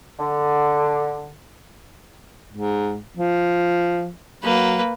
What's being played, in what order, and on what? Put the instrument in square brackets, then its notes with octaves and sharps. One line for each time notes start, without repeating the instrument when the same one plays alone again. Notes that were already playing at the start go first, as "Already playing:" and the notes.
[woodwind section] D3
[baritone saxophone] G#2
F3
[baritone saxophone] F#3 [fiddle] A#3 B4